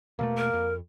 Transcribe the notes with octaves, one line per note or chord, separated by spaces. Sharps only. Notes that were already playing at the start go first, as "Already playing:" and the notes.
E1 B2 A3 A#3
A#4
F2